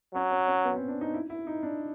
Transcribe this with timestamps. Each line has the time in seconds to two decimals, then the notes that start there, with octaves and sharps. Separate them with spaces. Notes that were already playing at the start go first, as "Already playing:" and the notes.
0.14 F#3 C#4
0.31 C#4
0.47 C#4
0.64 B3
0.76 C4
0.88 D4
1.01 D#4
1.14 E4
1.30 E4
1.47 D#4
1.63 D4